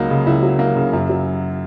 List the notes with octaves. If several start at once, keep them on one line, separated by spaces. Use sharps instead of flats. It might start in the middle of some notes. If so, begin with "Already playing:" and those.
Already playing: C#2 F#3 A#3 D#4
C#3
C#2 E4
F#3
A#3
C#3
F#2
F#3